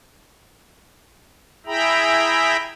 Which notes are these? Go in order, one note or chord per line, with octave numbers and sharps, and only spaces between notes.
E4 G#4 E5 G5 A#5 B5